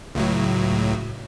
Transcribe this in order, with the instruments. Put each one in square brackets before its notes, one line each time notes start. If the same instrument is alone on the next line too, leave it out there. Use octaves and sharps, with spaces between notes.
[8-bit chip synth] C#2 A2 F#3